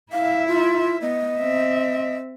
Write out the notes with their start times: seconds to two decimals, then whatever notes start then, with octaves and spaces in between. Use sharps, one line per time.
0.13 E4 E5 F5
0.48 F4
1.02 B3 D#5
1.39 C4 E5